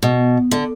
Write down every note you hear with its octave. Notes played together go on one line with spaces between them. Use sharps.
B2
D3